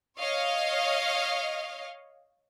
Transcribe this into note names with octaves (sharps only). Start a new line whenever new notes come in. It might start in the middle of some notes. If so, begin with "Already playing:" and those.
C#5 D#5 F5